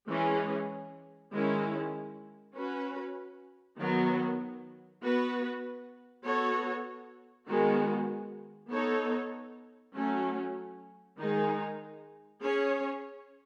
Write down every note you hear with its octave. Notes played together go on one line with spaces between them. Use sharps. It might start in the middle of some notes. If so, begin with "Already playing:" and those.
E3 G#3 C#4 G#4
D#3 G#3 C#4 E4
C#4 F#4 B4
D#3 F#3 B3
B3 F#4 B4
B3 F#4 A4 C#5
D#3 G#3 B3 F#4
B3 D#4 A4 C#5
F#3 A3 C#4
D#3 G#3 D#4 G#4
C#4 G#4 C#5